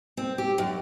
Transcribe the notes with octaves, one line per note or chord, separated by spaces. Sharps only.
C4
G4
F#2